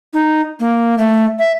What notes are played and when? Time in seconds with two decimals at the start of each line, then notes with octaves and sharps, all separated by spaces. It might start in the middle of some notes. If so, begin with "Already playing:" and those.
0.13 D#4
0.60 A#3
0.98 A3
1.39 E5